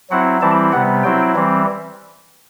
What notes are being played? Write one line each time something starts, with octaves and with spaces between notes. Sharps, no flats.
F#3 C4 E4 F#5
E3 G3 C4 E4 A5
C3 G3 B3 F#5
F#3 C4 E4 G5
E3 G3 C4